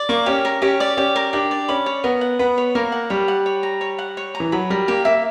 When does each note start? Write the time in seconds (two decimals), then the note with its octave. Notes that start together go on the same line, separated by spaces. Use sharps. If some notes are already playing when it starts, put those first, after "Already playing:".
Already playing: D5
0.09 A#3 C#6
0.26 C#4 G4
0.45 A#4
0.62 C#4 G4
0.80 D5
0.97 C#4 G4
1.16 A#4
1.33 D4 G4
1.51 D5
1.68 C#4 B5
1.86 C#5
2.04 B3 A#4
2.21 F#5
2.39 B3 B5
2.58 C#5
2.75 A#3 A#4
2.92 F#5
3.10 G3 C#5
3.28 F#5
3.46 C#5
3.63 A#5
3.81 C#5
3.99 F#5
4.17 C#5
4.35 A#5
4.40 E3
4.52 F#3 B5
4.70 G3 A#4
4.88 A#3 G4
5.05 A#3 E5